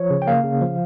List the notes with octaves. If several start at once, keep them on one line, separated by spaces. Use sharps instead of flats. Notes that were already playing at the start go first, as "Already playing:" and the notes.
Already playing: F3 C#5
C#3
G5
A#3 F5
C#3
F3